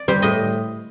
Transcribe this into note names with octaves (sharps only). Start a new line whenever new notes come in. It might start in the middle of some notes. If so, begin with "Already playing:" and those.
Already playing: D5
G3 C5
A2 D#5